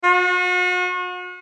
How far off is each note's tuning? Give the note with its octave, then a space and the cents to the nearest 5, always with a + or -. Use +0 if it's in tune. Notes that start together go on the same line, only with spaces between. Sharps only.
F#4 -40